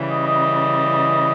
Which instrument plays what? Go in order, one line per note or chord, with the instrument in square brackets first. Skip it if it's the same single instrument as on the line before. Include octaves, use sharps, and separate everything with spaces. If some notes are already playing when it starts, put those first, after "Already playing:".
Already playing: [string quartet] C#3 E3 G3
[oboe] D#5
D#5